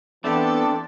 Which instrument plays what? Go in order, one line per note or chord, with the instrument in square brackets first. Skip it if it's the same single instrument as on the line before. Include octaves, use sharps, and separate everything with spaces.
[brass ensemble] E3 B3 [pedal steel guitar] A3 C4 G4 [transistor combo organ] D4 [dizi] A4